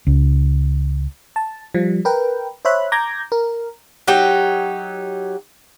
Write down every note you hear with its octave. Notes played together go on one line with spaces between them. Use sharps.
C#2
A5
F3 G3
A#4 B4 G5
C5 C#5 E5 B5 F#6
A#5 D6 G6 G#6 A#6
A#4
F#3 D#4 G4